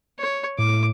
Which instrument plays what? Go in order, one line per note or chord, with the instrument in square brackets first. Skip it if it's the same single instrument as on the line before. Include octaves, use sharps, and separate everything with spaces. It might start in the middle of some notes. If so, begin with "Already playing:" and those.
[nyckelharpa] C#5
[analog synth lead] A2 [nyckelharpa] D6